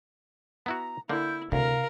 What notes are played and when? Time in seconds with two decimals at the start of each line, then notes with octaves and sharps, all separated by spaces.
0.66 B3 E4 F#4 A#5
1.09 D3 A#3 E4 G6
1.52 D2 C3 A#4 F5